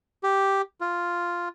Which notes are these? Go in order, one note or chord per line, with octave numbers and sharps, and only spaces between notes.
G4
F4